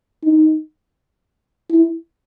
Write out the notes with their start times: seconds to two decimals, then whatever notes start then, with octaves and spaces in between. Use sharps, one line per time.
0.24 D#4
1.71 E4